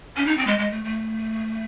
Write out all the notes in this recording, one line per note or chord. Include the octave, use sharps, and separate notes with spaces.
C#4
D#4
C4
G#3
G#3
A3
A3